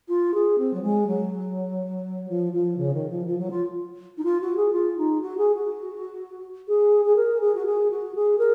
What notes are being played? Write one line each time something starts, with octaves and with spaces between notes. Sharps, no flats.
F4
G#4
C4
F#3
G#3
F#3
F3
F3
C#3
D#3
F3
F3
F#3
F4
D#4
F4
F#4
G#4
F4
D#4
F#4
G#4
F#4
G#4
G#4
A#4
G#4
F#4
G#4
F#4
G#4
A#4